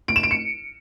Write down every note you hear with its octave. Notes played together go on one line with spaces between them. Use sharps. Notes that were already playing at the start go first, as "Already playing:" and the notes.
D7
E7
D7
C#7